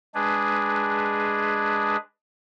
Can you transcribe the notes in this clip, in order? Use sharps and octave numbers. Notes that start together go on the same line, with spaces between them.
G#3 D4 G#4 B4